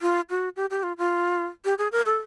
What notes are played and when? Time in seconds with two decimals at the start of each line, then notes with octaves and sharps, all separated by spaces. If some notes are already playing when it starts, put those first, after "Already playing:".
0.02 F4
0.30 F#4
0.56 G4
0.70 G4
0.83 F4
0.98 F4
1.65 G4
1.78 G#4
1.92 A#4
2.06 A4